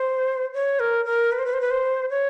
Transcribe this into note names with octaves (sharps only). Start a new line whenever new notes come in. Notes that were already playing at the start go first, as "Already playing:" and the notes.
Already playing: C5
C#5
A#4
A#4
B4
C5
B4
C5
B4
C5
C#5